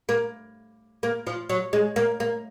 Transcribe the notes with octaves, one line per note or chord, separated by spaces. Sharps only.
A#3
A#3
F3
F#3
G#3
A#3
A#3